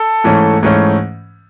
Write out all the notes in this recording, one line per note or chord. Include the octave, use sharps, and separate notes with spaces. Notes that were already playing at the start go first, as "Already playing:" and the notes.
Already playing: A4
G#2 E3 A3 C#4
G#2 E3 A3 C#4